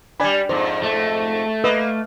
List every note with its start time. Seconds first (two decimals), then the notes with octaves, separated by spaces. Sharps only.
0.20 G3 D4 D5 G#5 B5
0.49 F2 G#2 C5
0.83 A3
1.64 A#3 B4 D#5 E6